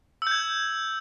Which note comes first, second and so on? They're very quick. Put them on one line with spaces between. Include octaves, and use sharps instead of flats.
E6 G6 G#6